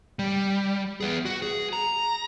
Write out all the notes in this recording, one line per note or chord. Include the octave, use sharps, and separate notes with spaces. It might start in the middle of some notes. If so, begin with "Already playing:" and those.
G3
B3 G#4
F#4
G#4
A#5